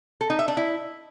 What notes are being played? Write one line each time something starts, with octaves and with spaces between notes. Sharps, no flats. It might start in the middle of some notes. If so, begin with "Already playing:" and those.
A4
D#4
E5
D4
E4